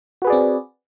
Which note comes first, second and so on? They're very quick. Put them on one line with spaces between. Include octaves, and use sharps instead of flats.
F#4 B4 G#4 D5 C4